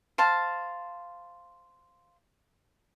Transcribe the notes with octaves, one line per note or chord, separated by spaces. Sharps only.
C5 F5 A5